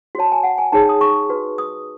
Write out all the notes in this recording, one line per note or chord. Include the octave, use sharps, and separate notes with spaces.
F#4 C#5 A5
G#5
F#5
G#5
D#4 G#4 C#5 A5
D#6
C#6
F#4 B4
D#6